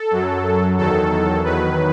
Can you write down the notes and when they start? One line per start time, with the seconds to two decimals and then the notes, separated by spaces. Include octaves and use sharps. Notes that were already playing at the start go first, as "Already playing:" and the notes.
Already playing: A4
0.11 F#2 F#3
0.77 E2 D#3 F#3 A4
1.44 E2 D#3 F#3 B4